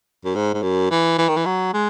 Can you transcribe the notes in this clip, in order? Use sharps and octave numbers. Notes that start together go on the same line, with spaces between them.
F#2
G#2
G#2
F#2
E3
E3
D#3
E3
F#3
G#3